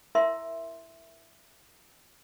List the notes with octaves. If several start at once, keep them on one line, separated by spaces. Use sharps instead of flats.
E4 A#4 E5 C6